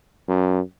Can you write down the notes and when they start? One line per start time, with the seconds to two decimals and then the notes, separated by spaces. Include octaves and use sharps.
0.28 F#2